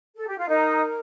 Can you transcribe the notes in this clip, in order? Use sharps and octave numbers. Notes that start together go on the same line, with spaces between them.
A4
G4
F4
D#4 A#4